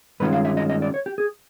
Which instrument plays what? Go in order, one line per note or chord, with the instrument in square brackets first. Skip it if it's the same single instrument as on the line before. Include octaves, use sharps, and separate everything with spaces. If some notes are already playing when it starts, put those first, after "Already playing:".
[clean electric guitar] G2 D#3 G#3 C#4 F4 B4
F5
E5
D#5
D#5
D5
C#5
G4
G#4